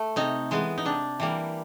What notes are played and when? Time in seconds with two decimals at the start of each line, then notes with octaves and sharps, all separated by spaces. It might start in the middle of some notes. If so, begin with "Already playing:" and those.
Already playing: A3
0.16 C3 D#4
0.51 E3 G#3 B3
0.78 D#4
0.85 C3 D4
1.20 E3 G3 A#3